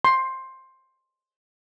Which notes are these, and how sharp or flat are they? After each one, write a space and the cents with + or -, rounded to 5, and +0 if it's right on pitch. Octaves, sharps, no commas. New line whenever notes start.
C6 +10